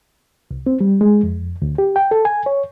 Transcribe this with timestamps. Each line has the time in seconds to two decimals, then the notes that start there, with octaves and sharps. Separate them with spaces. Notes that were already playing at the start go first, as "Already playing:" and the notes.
0.51 C2
0.67 C4
0.81 G3
1.01 G#3
1.23 F2
1.62 D2
1.78 G4
1.96 G5
2.11 A4
2.25 G#5
2.46 C#5